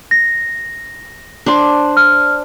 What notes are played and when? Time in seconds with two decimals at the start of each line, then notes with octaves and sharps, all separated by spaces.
0.11 A#6
1.46 D4 C5
1.97 F6